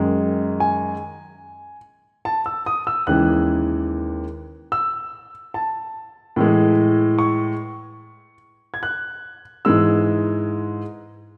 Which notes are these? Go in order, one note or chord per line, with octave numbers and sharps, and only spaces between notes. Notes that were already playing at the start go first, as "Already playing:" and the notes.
Already playing: F#2 D#3 G#3
G#5
A5
E6
D#6
E6
D#2 C#3 E3 G#3 F#6
E6
A5
A2 E3 G#3
C#6
G#6
F#6
G#2 E3 G#3 E6